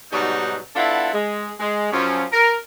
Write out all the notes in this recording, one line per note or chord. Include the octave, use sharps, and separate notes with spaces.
G#2 B2 F#3 G3 D#4 F#4
B3 D4 E4 F4 A4 F#5
G#3
G#3
F#2 F3 C#4
A#4